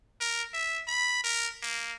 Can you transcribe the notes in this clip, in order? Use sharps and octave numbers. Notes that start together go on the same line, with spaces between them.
A#4
E5
B5
A#4
A#3